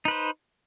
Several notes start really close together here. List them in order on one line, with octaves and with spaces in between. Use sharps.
D#4 B4 C5